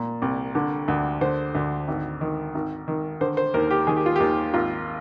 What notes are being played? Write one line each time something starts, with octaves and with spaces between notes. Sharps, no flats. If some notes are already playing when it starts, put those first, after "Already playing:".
Already playing: A#2
C2
D3
D2
D3 C5
D2
G#1
D#3
G#1
D#3
D3 C5
C5
D#2 A#4
G4
D#3 G#4
G4
F4
D#2 G4
G#1 F4